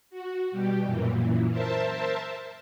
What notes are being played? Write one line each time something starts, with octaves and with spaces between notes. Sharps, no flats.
F#4
B2 G3 G4
F#2 A#2 E3
A#4 C5 E5 A5